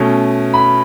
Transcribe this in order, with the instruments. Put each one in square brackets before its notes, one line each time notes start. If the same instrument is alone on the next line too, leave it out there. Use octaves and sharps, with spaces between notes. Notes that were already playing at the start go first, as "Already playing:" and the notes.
Already playing: [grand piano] B2 A3 C#4
B5